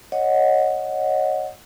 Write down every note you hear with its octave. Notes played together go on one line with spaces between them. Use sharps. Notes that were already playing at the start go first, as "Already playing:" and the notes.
C#5 D#5 F#5